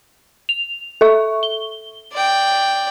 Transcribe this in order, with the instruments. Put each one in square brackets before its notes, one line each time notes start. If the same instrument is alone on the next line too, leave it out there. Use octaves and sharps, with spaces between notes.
[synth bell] F7
A4 E5 C#6
G7
[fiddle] D5 G5